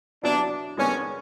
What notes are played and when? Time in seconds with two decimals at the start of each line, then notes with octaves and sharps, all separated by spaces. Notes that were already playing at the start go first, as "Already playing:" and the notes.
0.23 F#3 B3 D4 E4
0.77 D#3 G#3 B3 C#4 D4